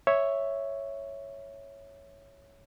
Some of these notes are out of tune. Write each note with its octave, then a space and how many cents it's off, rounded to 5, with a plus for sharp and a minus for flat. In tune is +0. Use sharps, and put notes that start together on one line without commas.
C#5 +0 E5 +0